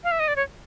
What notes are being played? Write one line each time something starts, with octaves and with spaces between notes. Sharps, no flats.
F5
E5
D#5
D5
C#5